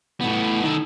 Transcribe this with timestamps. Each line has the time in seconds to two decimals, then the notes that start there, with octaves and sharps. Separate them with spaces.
0.21 A2 B3
0.63 D#3 A4